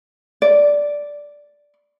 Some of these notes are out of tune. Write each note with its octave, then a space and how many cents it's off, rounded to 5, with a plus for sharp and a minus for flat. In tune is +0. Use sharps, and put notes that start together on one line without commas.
D5 -5